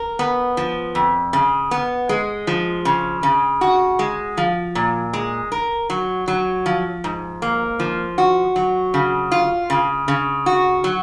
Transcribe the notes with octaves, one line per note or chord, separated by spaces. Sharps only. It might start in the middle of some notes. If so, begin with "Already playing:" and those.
Already playing: A#4
B3
F3
F2
C#3
B3
G#3
F3
C#3
C#3
F#4
G#3
F3
A#2
G#3
A#4
F#3
F#3
F3
G#2
A#3
F3
F#4
F#3
C#3
F4
C#3
C#3
F#4
F#3